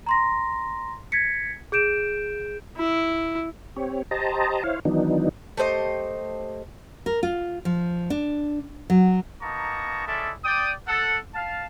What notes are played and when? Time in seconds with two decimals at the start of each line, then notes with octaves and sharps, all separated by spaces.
0.06 A#5 C6 A#6
1.12 G#6 A#6 B6 C#7
1.72 G#4 G6 D7 E7
2.78 E4
3.76 C4 G4 C#5
4.11 G4 C5 D#5 A5 A#5
4.63 E4 C5 C#5 F5
4.85 D#3 E3 F#3 B3 D4 D#4
5.57 A3 G4 C5 D#5
7.06 A#4
7.23 F4
7.65 F3
8.10 D4
8.90 F#3
9.42 A#3 B3 D#4 A5 A#5 C#6
10.07 G#3 C#4 E4 A4 D5 E5
10.45 D5 G5 D#6
10.88 A4 F#5
11.35 F5 A5